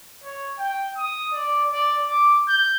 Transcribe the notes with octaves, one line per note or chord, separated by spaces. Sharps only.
C#5
G5
D#6
D5
D5
D6
G6